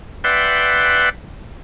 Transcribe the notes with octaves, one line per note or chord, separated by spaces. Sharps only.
B4 D5 E5 F#5 G5 C6